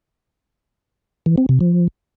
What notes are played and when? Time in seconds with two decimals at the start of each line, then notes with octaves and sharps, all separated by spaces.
1.26 E3
1.38 C4
1.49 C3
1.61 F3